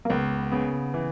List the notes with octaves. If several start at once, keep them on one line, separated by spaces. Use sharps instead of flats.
A#3
C#2 B3
C#3 B3
E3